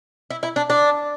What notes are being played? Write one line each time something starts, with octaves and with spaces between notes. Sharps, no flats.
E4
E4
D4
D4